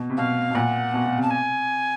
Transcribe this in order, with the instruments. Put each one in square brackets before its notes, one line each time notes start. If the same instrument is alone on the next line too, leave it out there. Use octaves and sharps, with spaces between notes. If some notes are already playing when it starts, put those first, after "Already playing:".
Already playing: [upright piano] B2
C3
[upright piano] B2 [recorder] F5
[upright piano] B2
[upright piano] A#2 [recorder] F#5
[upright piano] B2
B2
[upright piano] C3 [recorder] A5
[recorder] G#5